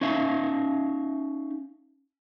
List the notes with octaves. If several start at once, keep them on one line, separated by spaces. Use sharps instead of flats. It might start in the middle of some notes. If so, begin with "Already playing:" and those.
C#4 D#4 E5 F5